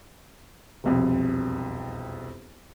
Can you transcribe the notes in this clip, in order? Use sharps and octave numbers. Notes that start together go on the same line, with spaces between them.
E1 C2 F2